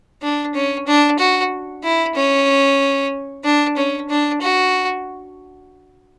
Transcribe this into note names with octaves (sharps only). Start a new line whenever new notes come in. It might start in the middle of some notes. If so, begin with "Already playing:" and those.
D4
C#4
D4
F#4
E4
C#4
D4
C#4
D4
F#4